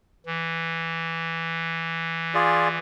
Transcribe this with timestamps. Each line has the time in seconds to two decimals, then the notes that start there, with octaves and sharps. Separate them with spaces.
0.26 E3
2.34 F4 G#4 D5